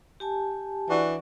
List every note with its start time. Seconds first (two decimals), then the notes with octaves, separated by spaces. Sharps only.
0.20 G4 G#5 A5
0.90 E3 D4 F#4 D5